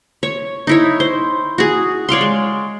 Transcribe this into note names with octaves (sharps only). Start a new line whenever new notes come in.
C#5
D#4 E4 C#5
C5
F#4 G#4
C#5 D5 F5 C6
G#3